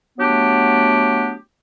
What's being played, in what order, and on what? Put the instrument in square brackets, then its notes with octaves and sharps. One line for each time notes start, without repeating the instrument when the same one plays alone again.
[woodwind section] F#3 A3 B3 D4 G4